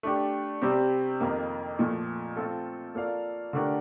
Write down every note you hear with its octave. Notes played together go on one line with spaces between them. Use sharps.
A3 D4 G4
C3 G3 C4 G4
F2 D#3 A#3
A#2 F3 A3
A3 C4 F4 A4
A#3 F4 A4 D5 F5
D3 A3 D4 G4 A#4